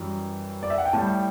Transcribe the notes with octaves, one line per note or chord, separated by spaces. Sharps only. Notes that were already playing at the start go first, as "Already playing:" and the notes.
Already playing: F#2 E3 G3
D5
E5
F#5
G5
A2 G3 A5